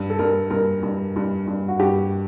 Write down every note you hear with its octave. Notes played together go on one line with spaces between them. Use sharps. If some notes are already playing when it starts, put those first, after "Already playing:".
Already playing: G2
A4
G2 A#4
G2 A#4
G2
G2
G2
F#4
G2 G4